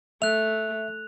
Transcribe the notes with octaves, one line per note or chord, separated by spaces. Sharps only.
A3 E5 F#6 F7